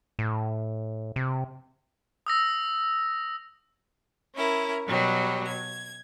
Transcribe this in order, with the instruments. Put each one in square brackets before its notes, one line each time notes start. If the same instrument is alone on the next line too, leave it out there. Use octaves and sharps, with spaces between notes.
[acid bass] A2
C3
[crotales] D#6 E6 A#6
[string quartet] C#4 E4 A#4
B2 F#3 G3
G#6